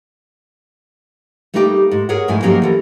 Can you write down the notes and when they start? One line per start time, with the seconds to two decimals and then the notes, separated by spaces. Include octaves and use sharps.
1.54 G3 A3 A#3 D#4 F4 G4
1.91 G#2
2.09 G#4 A#4 C#5 F#5
2.28 F2 G#2 A3 E4 G#5
2.43 F3 F#3 A#3 C#4 D#4 G4
2.62 E3 A4 A#4